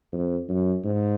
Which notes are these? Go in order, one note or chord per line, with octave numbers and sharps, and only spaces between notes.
F2
F#2
G#2